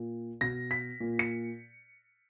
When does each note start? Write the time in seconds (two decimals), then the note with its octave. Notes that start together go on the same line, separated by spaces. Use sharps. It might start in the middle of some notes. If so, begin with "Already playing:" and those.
Already playing: A#2
0.41 B2 A#6
0.71 B6
1.00 A#2
1.19 C#7